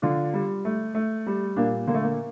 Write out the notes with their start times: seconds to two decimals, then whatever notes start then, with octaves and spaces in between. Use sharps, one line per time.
0.02 D3 D4 F4
0.33 G3
0.65 A3
0.95 A3
1.27 G3
1.56 A#2 A#3 D4
1.87 D3 A#3
1.94 A3
2.03 A#3